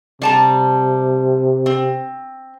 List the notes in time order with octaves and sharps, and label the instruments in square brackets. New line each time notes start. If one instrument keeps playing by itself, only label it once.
[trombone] C3 [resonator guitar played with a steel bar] G3 A5 A#5
[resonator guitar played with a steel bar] C4